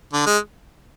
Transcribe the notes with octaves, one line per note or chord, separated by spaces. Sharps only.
D3
G#3